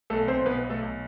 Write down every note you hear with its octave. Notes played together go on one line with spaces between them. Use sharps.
B1 A3 A4
B1 C4 C5
B1 B3 B4
B1
A3 A4
B1